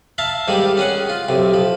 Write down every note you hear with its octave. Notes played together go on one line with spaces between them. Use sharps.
E5 F5 A5 A#5
G#2 D#3 G3 A#3
C#4 G#4 F#5
F4
B1 C3
F3